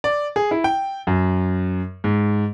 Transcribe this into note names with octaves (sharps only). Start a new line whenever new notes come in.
D5
G#4
E4
G5
F#2
G#2